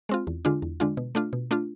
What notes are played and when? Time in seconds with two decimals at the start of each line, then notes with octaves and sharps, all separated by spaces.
0.09 G#3 C4 F4
0.27 E2
0.45 D3 G#3 D4 F4
0.62 E2
0.80 D3 G#3 D4 F4
0.97 B2
1.15 A3 D4 F4
1.33 B2
1.51 A3 D4 F4